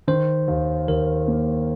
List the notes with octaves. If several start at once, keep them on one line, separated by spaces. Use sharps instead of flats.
D#3 C5
D#2
D#2 A#4
A#3